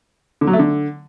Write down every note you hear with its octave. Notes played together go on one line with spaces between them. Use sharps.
D3
F#3
A3
D3